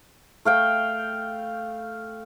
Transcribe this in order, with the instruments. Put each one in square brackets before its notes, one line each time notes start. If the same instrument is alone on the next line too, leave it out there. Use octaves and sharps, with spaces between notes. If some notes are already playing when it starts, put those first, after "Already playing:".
[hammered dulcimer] A3 F5 G5